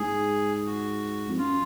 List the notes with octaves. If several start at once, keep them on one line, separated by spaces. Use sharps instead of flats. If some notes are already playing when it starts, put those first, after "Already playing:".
Already playing: G#2 G#4
F#4
F2
F#2 F4